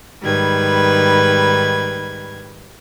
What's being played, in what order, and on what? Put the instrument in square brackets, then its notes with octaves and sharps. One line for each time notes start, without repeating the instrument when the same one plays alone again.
[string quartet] G#2 D#3 G3 B4 G#6